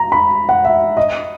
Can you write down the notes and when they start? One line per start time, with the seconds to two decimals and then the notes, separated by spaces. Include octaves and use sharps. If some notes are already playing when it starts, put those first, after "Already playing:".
Already playing: A#5
0.12 B5
0.49 F#5
0.65 E5
0.97 D#5